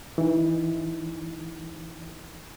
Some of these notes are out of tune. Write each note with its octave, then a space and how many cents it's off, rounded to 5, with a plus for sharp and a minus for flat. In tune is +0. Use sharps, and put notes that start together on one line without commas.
E3 -5 D#4 -15